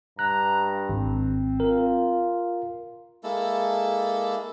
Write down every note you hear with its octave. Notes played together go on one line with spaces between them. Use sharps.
G2 A#5 F#6
G#1 C4
F4 A#4
G#3 A#3 E4 A4